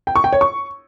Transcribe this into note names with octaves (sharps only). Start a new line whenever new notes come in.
G5
C#6
G5
C#5
C#6